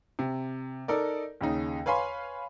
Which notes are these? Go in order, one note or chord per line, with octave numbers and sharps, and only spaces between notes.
C3
D#4 A4 A#4 D5
D#2 C#3 D#4
B4 C#5 F5 G#5 B5 C6